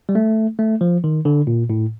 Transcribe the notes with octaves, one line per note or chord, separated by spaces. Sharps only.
G3
A3
A3
F3
D#3
D3
A#2
A2